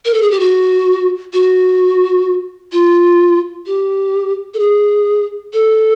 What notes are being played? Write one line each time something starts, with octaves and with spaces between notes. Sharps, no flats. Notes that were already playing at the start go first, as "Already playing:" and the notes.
A#4
A4
G#4
G4
F#4
F#4
F4
G4
A4
G#4
A4